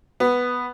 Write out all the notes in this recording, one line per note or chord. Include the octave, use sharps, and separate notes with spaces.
B3